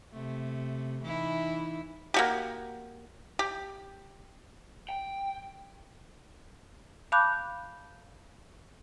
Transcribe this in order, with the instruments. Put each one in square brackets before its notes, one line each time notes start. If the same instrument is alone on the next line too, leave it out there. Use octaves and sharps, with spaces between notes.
[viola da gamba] C3 A3
E3 D#4 E4
[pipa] A#3 F#4 G4
G4
[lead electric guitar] G5
[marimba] F5 A5 B5 D6 F#6 G6